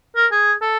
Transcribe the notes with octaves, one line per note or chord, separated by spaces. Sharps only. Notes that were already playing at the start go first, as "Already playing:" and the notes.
A#4
G#4
A4